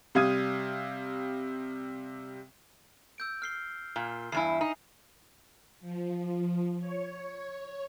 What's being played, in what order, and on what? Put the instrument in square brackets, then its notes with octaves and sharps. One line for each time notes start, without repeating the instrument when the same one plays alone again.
[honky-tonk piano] C3 G3 F5 D#6 G#6 D#7
[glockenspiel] E6 G6 D7
F6 C7 G7
[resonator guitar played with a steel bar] A#2 [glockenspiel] G7
[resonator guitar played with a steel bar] E2 G2 E4 [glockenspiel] G#5 C7
[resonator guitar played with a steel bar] D#4
[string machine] F3
C#5